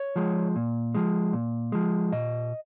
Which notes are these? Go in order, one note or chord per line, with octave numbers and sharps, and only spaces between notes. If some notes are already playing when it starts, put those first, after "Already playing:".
Already playing: C#5
F3 G#3
A#2
F3 G#3
A#2
F3 G#3
A#2 D#5